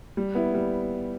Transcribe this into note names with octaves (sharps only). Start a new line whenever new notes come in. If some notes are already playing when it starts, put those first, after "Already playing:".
G3
B3 E4
G3